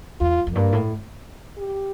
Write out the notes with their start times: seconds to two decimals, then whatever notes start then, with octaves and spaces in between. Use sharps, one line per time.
0.20 E2 F4
0.47 F2
0.55 G2 A#3
0.73 A2
1.58 G4